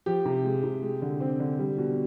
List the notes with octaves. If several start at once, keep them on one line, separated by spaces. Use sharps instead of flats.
F3 G4
C3
G#3
C3
G#3
D3
C4
D3
G3
B2